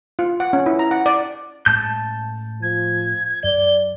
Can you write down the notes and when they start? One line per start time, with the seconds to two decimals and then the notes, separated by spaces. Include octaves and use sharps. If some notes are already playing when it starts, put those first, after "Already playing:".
0.19 F4
0.40 F#5
0.53 C#4
0.66 E4
0.79 A#5
0.91 F#5
1.06 D5
1.66 A2 G#3 C#4 A5 G6
2.62 F3 G#6
3.44 F#2 D5 G7